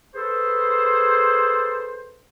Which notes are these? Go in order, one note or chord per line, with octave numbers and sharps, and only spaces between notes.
G#4 A4 B4 C5